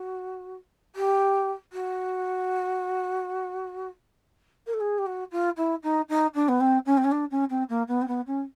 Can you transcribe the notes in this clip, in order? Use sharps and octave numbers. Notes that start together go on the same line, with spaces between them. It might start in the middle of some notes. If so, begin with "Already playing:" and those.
Already playing: F#4
G4
F#4
A#4
A4
G#4
G4
F#4
F4
E4
D#4
D#4
D4
B3
C4
C#4
C4
C#4
D4
C#4
C4
A#3
B3
C4
B3
C#4